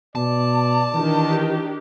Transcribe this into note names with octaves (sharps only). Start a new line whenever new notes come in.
B2 D5 A5
D#3 E3 D4 G4